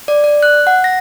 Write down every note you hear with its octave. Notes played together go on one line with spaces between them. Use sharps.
D5
D5
F#6
F#5
A#6